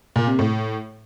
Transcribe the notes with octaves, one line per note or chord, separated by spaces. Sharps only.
A#2
C3
A2